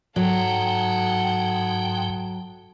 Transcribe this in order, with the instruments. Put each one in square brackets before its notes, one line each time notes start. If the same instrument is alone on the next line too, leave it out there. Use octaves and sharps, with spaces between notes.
[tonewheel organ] G#2 G5 [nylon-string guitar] F#3 [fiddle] A4 F#5